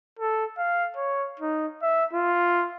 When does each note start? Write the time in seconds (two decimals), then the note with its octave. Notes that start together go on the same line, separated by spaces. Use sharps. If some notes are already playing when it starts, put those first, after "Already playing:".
0.19 A4
0.58 F5
0.96 C#5
1.40 D#4
1.82 E5
2.13 F4